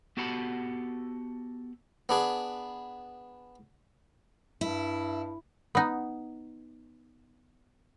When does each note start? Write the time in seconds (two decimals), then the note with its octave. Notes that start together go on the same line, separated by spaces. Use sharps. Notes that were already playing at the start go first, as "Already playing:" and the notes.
0.17 B3 F#4 G4 A4 F#5 B5
2.09 B3 D4 G#4
4.61 G2 E4
5.75 B3 D#4